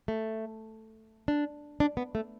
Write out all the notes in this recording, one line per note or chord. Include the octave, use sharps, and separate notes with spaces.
A3
D4
D4
B3
A3